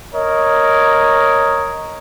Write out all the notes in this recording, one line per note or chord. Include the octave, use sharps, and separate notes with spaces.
A#4 C#5 D#5